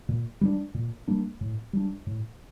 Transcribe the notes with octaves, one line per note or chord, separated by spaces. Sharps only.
A#2
G3 A#3 D4
A#2
G3 A#3 D4
A2
G3 D4
A2